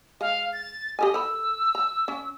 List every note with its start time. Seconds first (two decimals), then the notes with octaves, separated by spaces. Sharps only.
0.21 G#3 F5
0.53 A6
0.99 G4 A4 D#5 G#5
1.14 A4 C5 B5 E6
1.75 A#5
2.08 C#4